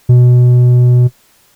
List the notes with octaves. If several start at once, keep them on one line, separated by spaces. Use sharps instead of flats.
B2